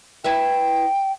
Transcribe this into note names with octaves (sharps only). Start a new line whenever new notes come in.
E4 B4 E5 G5